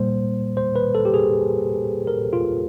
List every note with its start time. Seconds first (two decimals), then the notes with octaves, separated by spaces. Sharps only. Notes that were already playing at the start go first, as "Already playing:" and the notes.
Already playing: A#2 G3 A#3 C5
0.57 C5
0.76 B4
0.95 A4
1.05 G4
1.14 G#4
2.07 A#4
2.33 F4